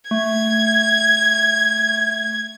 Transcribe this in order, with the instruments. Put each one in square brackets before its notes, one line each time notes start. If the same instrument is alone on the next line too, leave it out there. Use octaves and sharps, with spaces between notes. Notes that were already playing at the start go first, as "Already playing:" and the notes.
[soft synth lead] A3 [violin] G#6